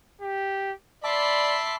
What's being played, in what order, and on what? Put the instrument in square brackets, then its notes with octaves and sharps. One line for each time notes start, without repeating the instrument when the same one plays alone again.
[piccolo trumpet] G4
[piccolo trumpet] D5 [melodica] E5 A5 D6 [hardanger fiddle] B5 C6